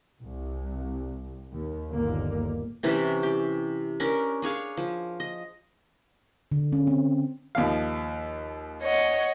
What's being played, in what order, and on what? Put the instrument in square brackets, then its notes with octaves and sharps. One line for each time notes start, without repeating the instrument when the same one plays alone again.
[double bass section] C2
D#2
G1 D#2 A#2 D3 A#3
[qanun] C3 E3 C#4 B4
G4
C#4 D4 A#4 B4
D4 G#4 C#5 F5
F3
D#5
[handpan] D3
C#4
C4
[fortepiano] D#2 F3 F5
[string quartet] C#5 D#5 F#5